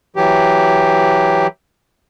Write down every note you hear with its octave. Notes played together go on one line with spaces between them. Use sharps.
E3 F#3 G4